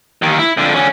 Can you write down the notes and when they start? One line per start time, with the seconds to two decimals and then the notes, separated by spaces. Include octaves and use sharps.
0.22 D#2 D#3
0.39 E4
0.57 F2 D3
0.74 D3 C#4